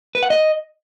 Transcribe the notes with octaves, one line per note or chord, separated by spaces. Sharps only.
B4
F#5
D#5